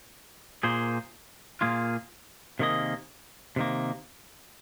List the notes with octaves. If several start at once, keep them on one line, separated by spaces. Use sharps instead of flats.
A#2 A#3 G#4 C5
A#2 A#3 F4 G#4
C3 D#3 A#3 G#4 D#5
C3 D#3 A#3